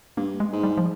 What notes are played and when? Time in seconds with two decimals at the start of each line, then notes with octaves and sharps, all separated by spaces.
0.17 G2 A#3
0.40 G#3
0.53 G#2
0.63 G3
0.78 F3